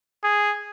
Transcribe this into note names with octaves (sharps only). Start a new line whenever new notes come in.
G#4